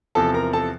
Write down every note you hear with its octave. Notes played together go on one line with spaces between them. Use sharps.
E2 C3 F3 A4 A5
A#4 A#5
A4 A5